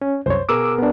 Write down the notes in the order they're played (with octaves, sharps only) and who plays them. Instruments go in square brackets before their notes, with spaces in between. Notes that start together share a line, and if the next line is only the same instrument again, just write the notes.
[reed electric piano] C#4
[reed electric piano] C2 F#2 C#5 [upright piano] C5
[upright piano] B2 G#4 A#4 [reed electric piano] D6 E6
[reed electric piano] B3 D4